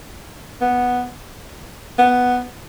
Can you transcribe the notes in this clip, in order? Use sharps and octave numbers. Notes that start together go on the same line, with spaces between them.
B3
B3